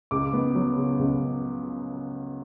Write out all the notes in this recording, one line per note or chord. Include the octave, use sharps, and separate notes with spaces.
C#2 D6
B3
F#3
C#3
C#2